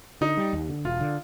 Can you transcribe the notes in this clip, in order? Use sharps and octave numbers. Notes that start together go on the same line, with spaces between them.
D3 D#4
G3
D#2
D3
E1 F4
D3